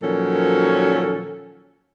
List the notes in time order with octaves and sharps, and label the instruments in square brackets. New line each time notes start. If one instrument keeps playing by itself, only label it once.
[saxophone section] A#2 D#3 F3 F#3 C#4 A4